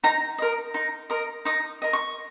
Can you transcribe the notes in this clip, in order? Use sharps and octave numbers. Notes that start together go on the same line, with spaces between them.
D#4 A#5
A#4 D#5
D#4
A#4 D#5
D#4 D#6
A#4 D#5
C#6